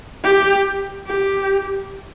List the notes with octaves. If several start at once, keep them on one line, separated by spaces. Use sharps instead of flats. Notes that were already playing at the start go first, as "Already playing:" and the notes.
G4
G4